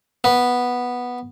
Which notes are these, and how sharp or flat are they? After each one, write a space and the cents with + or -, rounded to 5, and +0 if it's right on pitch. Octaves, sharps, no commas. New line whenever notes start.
B3 -5